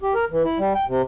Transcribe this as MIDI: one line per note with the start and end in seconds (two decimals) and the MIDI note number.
0.02 0.14 67
0.14 0.25 70
0.31 0.43 52
0.45 0.58 64
0.58 0.73 55
0.75 0.85 79
0.88 1.02 48